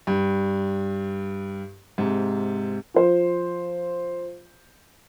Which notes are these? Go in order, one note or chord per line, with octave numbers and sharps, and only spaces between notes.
G2
G#2 C3
F3 C5